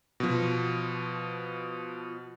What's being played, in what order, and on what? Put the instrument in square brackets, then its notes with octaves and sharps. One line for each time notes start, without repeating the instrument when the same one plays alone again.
[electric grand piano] B2 F3